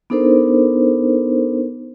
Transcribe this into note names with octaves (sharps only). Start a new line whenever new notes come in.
B3 D4 D#4 A4 A#4 C5